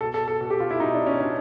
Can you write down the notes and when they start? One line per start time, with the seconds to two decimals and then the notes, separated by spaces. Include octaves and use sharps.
0.01 B2 A4
0.14 A4
0.28 A4
0.41 B2 A4
0.50 G4
0.60 F4
0.70 E4
0.80 B2 D#4
0.94 D4
1.07 C#4
1.20 B2 D4